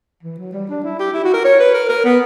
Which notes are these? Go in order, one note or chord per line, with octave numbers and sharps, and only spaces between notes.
E3
F#3
G3
D4
E4
G4
E4
F#4
A#4
C#5
B4
A#4
A#4
B3